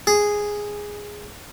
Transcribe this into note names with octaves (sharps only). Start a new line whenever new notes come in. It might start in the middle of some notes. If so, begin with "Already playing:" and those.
G#4